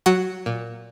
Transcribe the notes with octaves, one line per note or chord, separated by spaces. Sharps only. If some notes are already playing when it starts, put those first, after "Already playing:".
F#3 F#4
A#2